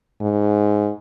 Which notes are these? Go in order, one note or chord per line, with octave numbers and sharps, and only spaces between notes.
G#2